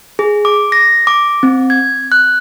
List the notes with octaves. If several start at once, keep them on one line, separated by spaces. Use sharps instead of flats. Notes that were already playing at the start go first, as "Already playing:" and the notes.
G#4
D6
A#6
D6
C4
G#6
F#6